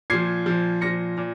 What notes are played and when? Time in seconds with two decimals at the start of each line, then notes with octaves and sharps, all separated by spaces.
0.10 A#2 F3 G#6 C7
0.46 A#2 F3
0.81 A#2 F3 A#6 C#7
1.17 A#2